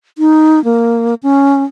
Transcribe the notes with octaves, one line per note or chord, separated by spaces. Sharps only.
D#4
A#3
C#4